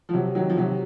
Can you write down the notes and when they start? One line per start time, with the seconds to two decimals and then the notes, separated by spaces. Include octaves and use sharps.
0.09 F3
0.13 C3 F#3
0.35 D#3 F#3
0.50 F3
0.57 C3 F#3